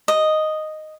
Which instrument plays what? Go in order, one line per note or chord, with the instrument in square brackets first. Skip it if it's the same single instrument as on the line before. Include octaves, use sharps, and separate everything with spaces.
[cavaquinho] D#5